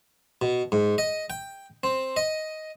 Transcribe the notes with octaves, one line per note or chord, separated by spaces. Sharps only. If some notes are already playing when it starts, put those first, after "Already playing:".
B2
G#2
D#5
G5
C4
D#5